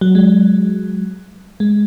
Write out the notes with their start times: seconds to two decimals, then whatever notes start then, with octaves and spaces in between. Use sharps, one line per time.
0.01 F#3
0.15 G#3
1.60 G#3